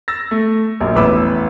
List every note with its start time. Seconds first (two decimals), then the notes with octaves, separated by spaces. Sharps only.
0.08 E6 A6 A#6
0.31 A3
0.80 A#1 F#2 G3
0.96 A1 E2 B4 B5 D6 E6